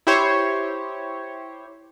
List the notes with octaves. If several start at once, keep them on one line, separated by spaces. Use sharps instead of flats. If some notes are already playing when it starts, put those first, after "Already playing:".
E4 G4 C5 C#5